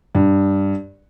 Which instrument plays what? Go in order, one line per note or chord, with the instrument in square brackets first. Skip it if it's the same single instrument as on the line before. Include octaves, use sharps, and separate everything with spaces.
[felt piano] G2